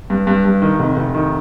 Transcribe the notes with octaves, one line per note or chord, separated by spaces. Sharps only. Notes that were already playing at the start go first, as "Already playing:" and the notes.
G2
G2
G2
D#3
F1
F1
D#3